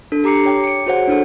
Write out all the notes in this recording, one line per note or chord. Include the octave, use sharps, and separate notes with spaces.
D4 A4
G4 A#5 D6 C7 C#7
C#5 G5 D6
C#7 D7
F#4 G#4 C5 C#5 F#5
D4 E4 A4